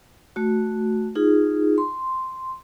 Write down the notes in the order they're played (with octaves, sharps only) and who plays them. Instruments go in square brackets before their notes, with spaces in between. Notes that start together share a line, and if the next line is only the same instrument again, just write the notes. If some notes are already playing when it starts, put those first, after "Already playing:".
[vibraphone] A3 F#4
D#4 F4 G#4
C6